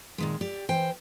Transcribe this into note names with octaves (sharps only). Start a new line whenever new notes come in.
A#2 D#3 G#3
G4 D5
E3 C5 G5